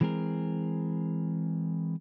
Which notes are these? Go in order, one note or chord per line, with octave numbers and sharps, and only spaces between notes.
E3 G#3 C4 G#4 A#4